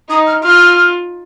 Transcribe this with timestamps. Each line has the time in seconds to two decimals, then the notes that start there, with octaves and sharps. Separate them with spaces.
0.09 D#4 D#6
0.27 F6
0.43 F4 F6